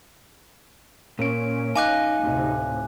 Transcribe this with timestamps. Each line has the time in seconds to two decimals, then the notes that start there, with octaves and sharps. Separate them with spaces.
1.19 A#2 C#4 A#4 D7
1.76 D#4 F5 G#5 D6 F#6
2.20 D2 A2 C3